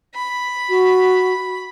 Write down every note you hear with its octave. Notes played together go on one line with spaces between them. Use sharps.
B5
F#4